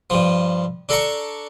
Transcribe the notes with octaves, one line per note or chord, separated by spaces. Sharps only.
G2 F3
D4 A4 A#5 C#6